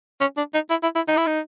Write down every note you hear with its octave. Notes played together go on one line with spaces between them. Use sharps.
C#4
D4
D#4
E4
E4
E4
D#4
E4
D#4